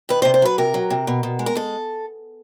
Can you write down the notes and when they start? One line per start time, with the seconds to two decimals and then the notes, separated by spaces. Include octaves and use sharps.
0.09 D#3 B4
0.22 C5
0.25 C3
0.34 C5
0.42 F#3 B4
0.58 C3 A#4
0.74 F#3
0.90 C3
1.07 B2
1.23 B2
1.39 G#3
1.46 A#4
1.55 G#3 A4